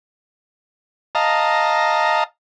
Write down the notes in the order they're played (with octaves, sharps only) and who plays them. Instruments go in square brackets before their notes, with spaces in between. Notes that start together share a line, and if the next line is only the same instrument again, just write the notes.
[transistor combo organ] D#5 F5 A5 A#5